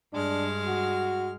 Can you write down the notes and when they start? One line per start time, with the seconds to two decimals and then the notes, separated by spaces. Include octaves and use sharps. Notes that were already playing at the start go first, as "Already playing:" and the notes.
0.13 G2 G#3 D4 F6
0.67 F#4